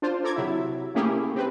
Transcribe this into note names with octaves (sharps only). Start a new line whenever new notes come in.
D4 F4 C5
A4 A#5 D6 G#6
C3 F#3 E4 E5
A3 A#3 C#4 E4 G4 G#4
C3 C4 B4